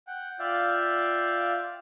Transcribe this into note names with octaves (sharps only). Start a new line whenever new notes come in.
F#5 G5
F4 D5 E5 F5 G5